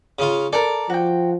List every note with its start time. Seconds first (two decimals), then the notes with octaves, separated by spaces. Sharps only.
0.19 C#3 F4
0.53 A4 A#4 D5
0.90 F3 F#4 G5